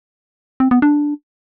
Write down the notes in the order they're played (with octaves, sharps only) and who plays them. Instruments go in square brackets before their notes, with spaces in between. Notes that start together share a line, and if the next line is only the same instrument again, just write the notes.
[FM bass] C4
B3
D4